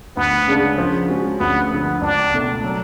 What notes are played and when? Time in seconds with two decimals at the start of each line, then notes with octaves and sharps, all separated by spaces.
0.17 D2 B3
0.47 C#3 G#3 D4
0.78 F3
1.09 G#3 C#4 F#4
1.40 D2 B3
1.71 D3 F3
2.01 C#2 D4
2.32 B2 A3
2.64 F#3